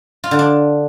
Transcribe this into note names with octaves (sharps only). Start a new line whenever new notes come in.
F4
D3
D4